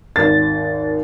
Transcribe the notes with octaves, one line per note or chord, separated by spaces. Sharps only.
G#1 D#2 A6